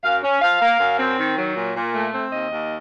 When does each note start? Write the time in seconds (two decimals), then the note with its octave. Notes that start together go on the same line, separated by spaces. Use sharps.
0.04 F#2 F5
0.24 C#4
0.42 F3 F5
0.61 A#3
0.80 F#2
1.00 C4
1.18 D#3
1.37 F#3
1.55 A#2
1.75 A#2
1.94 A3
2.13 C4
2.31 D#2 D#5
2.51 D#2